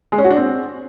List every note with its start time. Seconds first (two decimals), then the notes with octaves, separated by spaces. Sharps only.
0.12 G#3
0.18 C#4
0.24 F#4
0.30 D4
0.37 C4